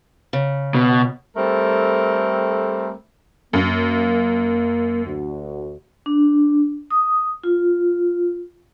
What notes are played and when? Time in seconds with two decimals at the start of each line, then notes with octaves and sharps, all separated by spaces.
0.33 C#3
0.75 B2
1.37 G3 A3 C4 A4 A#4
3.53 F#2 A#3
5.06 D2 F#4
6.06 D4
6.90 D#6
7.44 F4